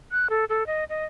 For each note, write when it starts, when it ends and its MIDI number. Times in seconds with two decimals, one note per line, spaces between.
0.12 0.28 90
0.30 0.45 69
0.49 0.66 69
0.67 0.84 75
0.89 1.05 75